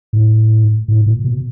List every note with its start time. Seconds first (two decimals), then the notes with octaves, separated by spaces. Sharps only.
0.13 A2
0.88 A2
1.06 A#2
1.24 B2